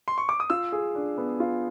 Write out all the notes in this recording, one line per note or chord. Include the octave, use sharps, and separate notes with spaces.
C6
C#6
D6
D#6
F4 E6
G#4
D4
B3
F4